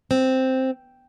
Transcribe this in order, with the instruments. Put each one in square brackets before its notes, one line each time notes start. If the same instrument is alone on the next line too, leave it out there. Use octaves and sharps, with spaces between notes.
[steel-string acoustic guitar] C4